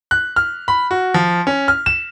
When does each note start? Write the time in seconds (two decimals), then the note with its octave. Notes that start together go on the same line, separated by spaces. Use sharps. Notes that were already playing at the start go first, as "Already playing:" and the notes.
0.11 F#6
0.36 F6
0.68 B5
0.91 F#4
1.14 F3
1.47 C#4
1.68 F6
1.86 E7